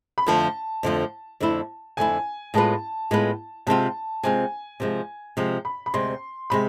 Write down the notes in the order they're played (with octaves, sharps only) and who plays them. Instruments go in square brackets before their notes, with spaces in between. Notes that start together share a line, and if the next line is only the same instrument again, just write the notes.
[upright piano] B5
[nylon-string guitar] F2 D3 F3 A3 [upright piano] A5
[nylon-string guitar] F2 D3 F3 A3
F2 D3 A3 E4
[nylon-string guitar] F2 D3 A3 E4 [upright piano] G#5
[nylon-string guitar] A2 G#3 B3 F4 B4 [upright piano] A5
[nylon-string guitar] A2 G#3 B3 F4 B4
[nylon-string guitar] C3 G#3 C4 F4 [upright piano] A5
[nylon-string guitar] C3 G#3 C4 F4 [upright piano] G#5
[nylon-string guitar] C3 F3 G#3
C3 F3 G#3
[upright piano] B5
B5
[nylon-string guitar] D2 C3 G#3 [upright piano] C6
[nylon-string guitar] C3 G#3 [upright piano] B5